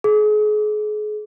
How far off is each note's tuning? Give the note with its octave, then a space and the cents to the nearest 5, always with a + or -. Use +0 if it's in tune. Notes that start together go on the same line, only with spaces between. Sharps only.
G#4 +35